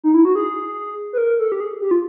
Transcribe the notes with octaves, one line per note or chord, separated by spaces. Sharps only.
D#4
E4
F#4
G#4
B4
A#4
A4
G4
G#4
G4
F4